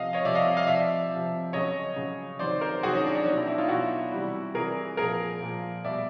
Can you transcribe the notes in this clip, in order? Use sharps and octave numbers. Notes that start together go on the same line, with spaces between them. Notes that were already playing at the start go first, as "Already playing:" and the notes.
Already playing: C3 F3 D#5 F5
C#5 D#5
C3 F3 D5 E5
D#5 F5
D#5 F5
C3 F3 D5 E5
C3 F3
C#3 F#3 C#5 D#5
C#3 F#3
C3 D#3 F#3 C5 D5
A#4 C5
C3 D#3 F#3 F#4 G#4
C#4 D#4
D4
D4
B2 F#3 C#4 D#4
D4 E4
D4 E4
D#4 F4
B2 F#3 E4 F#4
C3 E3 G3
C3 E3 G3 G#4 A#4
A#2 F3 G#4 A#4
A#2 F3
B2 G3 D5 E5